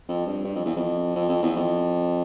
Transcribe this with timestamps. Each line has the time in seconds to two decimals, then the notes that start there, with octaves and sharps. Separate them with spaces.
0.09 F2
0.27 G2
0.45 G2
0.56 F2
0.66 E2
0.76 F2
1.16 F2
1.29 F2
1.43 E2
1.56 F2